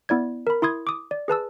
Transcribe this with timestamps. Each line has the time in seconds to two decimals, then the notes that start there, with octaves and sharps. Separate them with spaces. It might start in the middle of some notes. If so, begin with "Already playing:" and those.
0.09 B3 E4 D5 G#6
0.47 A#4 B5
0.62 E4 C6 D#6 G#6
0.87 D6 D#6
1.11 D5
1.28 G#4 B4 A5 E6